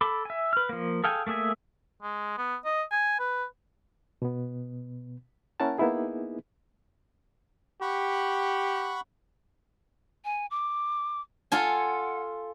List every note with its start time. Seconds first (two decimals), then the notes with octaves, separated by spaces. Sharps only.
0.01 A4 B5 D6
0.25 E5 G#5
0.53 B4 F6
0.69 F3 A#3
1.04 G#4 A4 F5 G5 G#5
1.27 A3 A#3 G#4 E5 G#5
2.02 G#3
2.38 B3
2.65 D#5
2.92 G#5
3.20 B4
4.22 B2 B3
5.60 A#3 C#4 E4 A#4 F#5 A5
5.78 A#3 B3 D#4 E4 G#4
7.82 G4 F#5 B5 C#6
10.25 G#5
10.51 D6
11.52 F4 A4 F#5 G#5